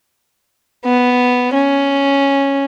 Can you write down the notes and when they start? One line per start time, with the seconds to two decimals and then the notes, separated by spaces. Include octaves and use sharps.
0.85 B3
1.54 C#4